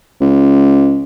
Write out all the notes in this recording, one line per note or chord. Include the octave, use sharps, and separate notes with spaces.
C#2